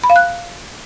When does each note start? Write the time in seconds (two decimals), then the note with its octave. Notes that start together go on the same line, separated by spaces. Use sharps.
0.04 B5
0.10 F5
0.16 F#6